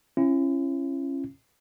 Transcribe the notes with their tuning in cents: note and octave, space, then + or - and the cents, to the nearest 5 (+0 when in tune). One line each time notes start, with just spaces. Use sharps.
C#4 -25 E4 +40